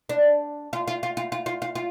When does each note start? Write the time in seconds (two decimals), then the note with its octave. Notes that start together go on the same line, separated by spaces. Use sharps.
0.09 D4
0.73 F4
0.88 F4
1.03 F4
1.17 F4
1.32 F4
1.46 F4
1.62 F4
1.75 F4